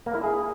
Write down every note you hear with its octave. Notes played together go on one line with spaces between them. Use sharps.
A#3
E4
G#4